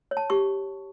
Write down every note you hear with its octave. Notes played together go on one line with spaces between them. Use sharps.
C#5
A5
G4 C#6